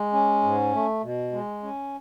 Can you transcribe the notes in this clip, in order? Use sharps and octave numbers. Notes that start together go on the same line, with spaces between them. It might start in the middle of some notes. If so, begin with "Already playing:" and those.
Already playing: G#3
C#4
G#2
A3
B2
G#3
C#4